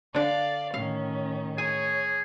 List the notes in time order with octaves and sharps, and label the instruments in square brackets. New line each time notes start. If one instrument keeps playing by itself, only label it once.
[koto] D3 D4 [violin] D5 F5
[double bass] A2 D#3 [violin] C#4 [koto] F5
[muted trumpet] G#4 [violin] C#5 [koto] G#5